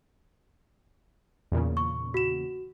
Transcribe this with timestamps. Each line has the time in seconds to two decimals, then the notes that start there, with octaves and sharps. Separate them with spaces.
1.52 E2 A#2 C#3
1.77 C#6
2.14 F#4 E7